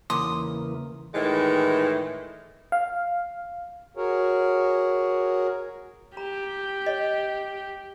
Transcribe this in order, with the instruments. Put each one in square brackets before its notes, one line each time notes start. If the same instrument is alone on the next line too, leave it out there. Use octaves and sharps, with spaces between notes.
[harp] E2 C#3 [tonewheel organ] E3 A#3 [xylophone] C6 D6 [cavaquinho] D#6
[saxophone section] A2 D#3 E3 G#3
[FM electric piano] F5
[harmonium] F#4 G#4 A#4 C#5
[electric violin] G4 [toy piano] A#5
[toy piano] C#5 D#5